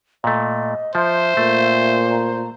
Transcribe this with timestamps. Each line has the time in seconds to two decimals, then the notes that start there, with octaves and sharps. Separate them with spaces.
0.24 A#2 A3 D#5
0.95 F3 C5 E5
1.37 A#2 A3
2.11 A#5